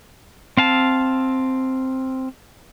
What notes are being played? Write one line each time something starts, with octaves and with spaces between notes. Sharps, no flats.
C4 F5 A5